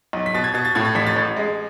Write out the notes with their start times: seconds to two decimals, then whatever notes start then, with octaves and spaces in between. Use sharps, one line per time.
0.13 B1
0.26 B6
0.34 B2 A6
0.44 G#6
0.54 B2 A6
0.65 A6
0.75 A2 G#6
0.85 A6
0.95 A1 B6
1.06 A6
1.16 A1
1.37 G#3